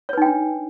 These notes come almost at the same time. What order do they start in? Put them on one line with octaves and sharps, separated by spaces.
C#5 B4 D#4 G5 D4